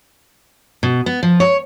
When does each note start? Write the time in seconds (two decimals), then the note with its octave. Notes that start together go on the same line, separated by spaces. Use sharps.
0.83 B2
1.06 B3
1.23 F3
1.40 C#5